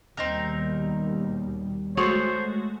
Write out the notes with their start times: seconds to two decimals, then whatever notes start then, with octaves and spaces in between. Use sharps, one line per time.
0.17 D#2 B2 G3 C4 D#4 A#4
1.97 G#3 A3 F#4 C5 C#5